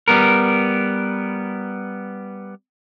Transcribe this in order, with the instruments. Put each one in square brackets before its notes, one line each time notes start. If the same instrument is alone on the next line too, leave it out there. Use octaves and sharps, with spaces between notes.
[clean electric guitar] G3 B3 A#4